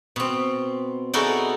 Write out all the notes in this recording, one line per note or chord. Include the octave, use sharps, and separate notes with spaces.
B2 C4
D#4 E4 F#4 G#4 A4 D5